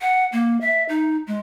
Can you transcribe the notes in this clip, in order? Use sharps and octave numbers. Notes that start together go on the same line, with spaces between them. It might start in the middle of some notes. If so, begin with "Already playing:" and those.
F#5
A#3
E5
D#4
G#3